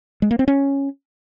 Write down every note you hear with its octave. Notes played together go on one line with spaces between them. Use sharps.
G#3
A#3
C4
C#4